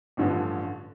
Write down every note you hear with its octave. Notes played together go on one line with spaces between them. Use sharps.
A1 G2 D3 F3 C#4